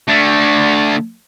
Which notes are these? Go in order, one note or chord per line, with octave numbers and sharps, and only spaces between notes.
D3 A3